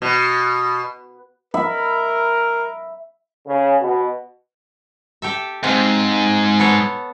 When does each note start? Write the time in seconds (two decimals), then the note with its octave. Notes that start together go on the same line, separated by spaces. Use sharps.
0.02 B2
1.54 A#4 E5 B5
3.46 C#3
3.81 B2
5.22 G4 A4 E5
5.64 G#2 C4 F5
6.59 B3 A4 C#5